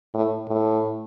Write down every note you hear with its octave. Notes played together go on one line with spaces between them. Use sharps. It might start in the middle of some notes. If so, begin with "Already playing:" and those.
A2
A2